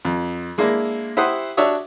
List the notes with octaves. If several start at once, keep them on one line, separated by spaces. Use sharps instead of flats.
F2
G#3 A#3 D4 E4
E4 G4 C5 F#5 D#6
D4 F#4 C#5 E5 D#6